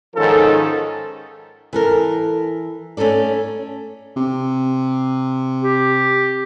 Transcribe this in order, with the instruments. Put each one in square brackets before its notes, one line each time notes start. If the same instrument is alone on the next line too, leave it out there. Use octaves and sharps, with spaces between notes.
[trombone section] G#2 D#3 F3 C#4 A4
[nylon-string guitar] E3 A4 A#4
A3 C#4 D#4 A4 D5
[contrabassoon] C3
[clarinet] G4